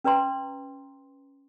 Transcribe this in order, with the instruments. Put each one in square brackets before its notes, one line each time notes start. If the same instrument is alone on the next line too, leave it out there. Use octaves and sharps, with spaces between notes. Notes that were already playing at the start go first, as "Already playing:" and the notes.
[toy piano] C#4 B4 D5 A#5 C6